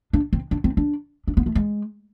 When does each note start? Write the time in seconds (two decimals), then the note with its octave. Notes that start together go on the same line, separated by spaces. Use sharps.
0.13 D4
0.33 C4
0.51 D4
0.64 C4
0.77 D4
1.28 D4
1.37 B3
1.46 A3
1.55 G#3